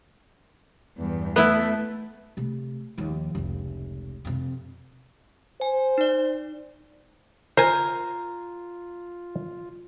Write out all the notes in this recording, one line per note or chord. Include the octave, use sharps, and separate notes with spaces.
E2 G2
A3 B3 E4
C3 A3
D#2 F3
F1 C#2
F2 C3
C5 G#5
D#4 D5
F4 A#4 C5 G#5